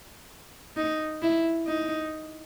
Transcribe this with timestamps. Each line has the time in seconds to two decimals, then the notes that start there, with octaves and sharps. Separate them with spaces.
0.77 D#4
1.22 E4
1.67 D#4